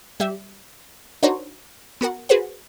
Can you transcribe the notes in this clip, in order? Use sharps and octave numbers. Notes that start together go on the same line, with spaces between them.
G3 G4 E5
D4 D#4 F#4 A#4 C5 C#5
B3 F#4 A#4 F#5
F#4 G#4 B4 C5 F#5